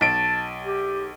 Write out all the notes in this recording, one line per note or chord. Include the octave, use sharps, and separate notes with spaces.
B1 A5 D7
G4